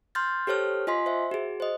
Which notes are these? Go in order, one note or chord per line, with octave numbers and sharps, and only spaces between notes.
C6 F6 G6 A6
G4 A4 C5 C#5 F6
F4 D#5 G#5 C6 B6
C5 E5
F#4 G#4
C5 D#5